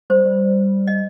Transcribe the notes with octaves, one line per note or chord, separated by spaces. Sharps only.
G3 C5
G3
D#5